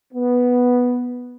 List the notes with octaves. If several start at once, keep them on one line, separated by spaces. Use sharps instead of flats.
B3